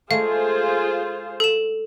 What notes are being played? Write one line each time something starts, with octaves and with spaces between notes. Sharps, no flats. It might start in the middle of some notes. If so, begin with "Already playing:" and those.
G#3 A3 F4 G#4 C5 F5
A4 E7